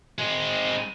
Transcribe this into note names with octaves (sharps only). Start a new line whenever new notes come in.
G#3 C4